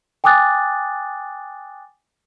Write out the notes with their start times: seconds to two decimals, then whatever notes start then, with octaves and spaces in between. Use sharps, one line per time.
0.24 G5 G#5 D6 D#6 F#6 A6